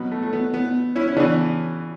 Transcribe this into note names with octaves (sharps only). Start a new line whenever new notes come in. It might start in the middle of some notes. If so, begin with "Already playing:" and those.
Already playing: B2 F#3 B3
A3
A3
B3
B3
C#4 E4
C#4
C#3 E3 B3 D4